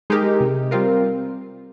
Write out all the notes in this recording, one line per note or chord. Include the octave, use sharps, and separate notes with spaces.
G#3 D#4 G4 A#4
C3
G3 C4 F4 A#4